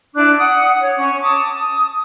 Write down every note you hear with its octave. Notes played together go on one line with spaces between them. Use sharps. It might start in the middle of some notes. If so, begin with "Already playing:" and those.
D4 E4 D6 F#6
F#5 D#6
C#5
C#4 C#6
A5 D6 D#6
D#6